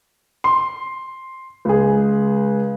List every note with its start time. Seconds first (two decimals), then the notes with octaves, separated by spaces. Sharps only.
0.44 C6
1.65 C#2 G#4